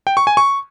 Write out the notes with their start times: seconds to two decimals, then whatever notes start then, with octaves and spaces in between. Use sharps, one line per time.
0.07 G5
0.17 C#6
0.27 G#5
0.37 C#6